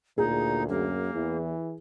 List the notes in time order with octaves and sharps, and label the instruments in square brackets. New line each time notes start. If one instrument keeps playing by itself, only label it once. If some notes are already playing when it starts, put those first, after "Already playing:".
[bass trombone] D2 [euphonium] A#2 [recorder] D#4 [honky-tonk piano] G#4
[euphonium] F#2 [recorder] A#3
[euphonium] E2 [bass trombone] E3